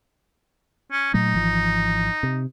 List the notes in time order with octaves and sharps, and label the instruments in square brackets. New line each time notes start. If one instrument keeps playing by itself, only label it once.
[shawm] C#4
[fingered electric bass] A#2 F#3 A3 [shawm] D#4
[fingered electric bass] G#1 E3 F3
C3